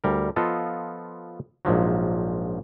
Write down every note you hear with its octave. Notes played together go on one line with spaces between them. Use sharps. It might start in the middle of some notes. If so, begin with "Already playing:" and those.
D2 G3 A#4
F3 B3 F4 A4 D#5
A#1 G#2 F3 F#3